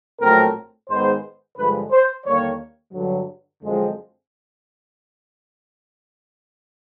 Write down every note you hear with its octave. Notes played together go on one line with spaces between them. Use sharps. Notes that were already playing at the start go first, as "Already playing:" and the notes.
A#1 A2 F#3 A3 C4 A#4
G#2 D#3 G#3 B3 C5
G2 D3 F3 G#3 B4
C5
D#2 D3 G3 A#3 C#5
G2 D3 F#3
F#2 D3 F3 G#3 C4